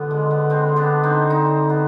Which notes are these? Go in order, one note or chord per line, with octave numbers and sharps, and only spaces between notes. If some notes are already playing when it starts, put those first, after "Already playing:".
Already playing: D3 B3 F4
G#3
B3
G#3 C4
B3 D4
C4 D#4
C4 D#4
B3